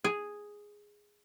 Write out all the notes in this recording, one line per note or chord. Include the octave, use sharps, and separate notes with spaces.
G#4